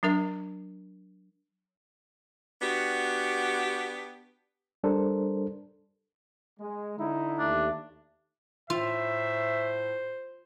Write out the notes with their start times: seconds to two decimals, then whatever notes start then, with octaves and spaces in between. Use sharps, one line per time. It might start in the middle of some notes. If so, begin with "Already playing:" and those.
0.03 F#3 D4 A#4 E5
2.62 B3 D4 F#4 G4
4.84 G3 D4 A4 A#4 C5
6.60 G#3
6.98 D3 D#4 E4
7.39 D#2 A3 D4
8.70 A2 F4 C5 E5